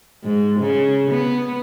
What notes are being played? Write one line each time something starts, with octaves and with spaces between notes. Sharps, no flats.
G#2
C#3
B3